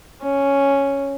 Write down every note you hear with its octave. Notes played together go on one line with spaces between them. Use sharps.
C#4